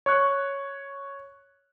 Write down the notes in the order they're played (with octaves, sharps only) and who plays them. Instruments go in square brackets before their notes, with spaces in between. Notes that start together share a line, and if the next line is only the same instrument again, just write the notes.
[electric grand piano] C#5 C#6 F#6